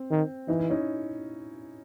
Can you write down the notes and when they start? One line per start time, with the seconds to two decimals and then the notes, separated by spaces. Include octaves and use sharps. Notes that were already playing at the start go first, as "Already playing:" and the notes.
Already playing: C4
0.11 D#3
0.48 E3 D#4
0.59 E4
0.70 C#4 D#4